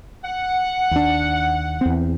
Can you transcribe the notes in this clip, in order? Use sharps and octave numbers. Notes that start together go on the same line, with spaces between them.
F#5
D#2 D4
E2 C4